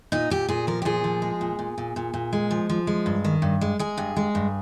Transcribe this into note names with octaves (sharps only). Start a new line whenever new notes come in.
A#2 D#4
A#2 G4
A#2 G#4
F3 A#4
G4
A#2 G#4
F3
G#3
A#2
A#2
A#2
A#2
A#2
G#3
F3
F3
G#3
G2
D#3
G2
G#3
G#3 G#4
G2
G#3
G2